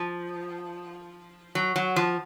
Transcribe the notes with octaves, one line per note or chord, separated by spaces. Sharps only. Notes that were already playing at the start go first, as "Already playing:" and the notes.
Already playing: F3
F#3
F#3
F3